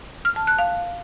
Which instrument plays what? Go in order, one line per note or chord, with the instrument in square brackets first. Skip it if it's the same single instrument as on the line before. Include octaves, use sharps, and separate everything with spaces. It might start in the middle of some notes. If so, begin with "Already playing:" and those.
[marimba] F6
A5
F#6
F5